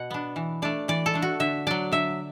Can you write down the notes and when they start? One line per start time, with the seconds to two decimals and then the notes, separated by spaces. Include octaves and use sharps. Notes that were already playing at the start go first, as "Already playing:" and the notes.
Already playing: B2 F#5
0.11 B3 D4
0.36 E3
0.62 A3 D4 D5
0.88 E3 D5
1.06 A4
1.14 A3 D4
1.22 F#4
1.40 D3 E5
1.67 F#3 D4 D5
1.92 D3 E5